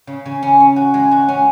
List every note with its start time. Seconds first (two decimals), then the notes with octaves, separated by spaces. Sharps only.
0.07 C#3
0.25 C#3
0.43 C#4
0.60 C#4
0.76 F#4
0.94 G#3
1.11 F#4
1.28 C#4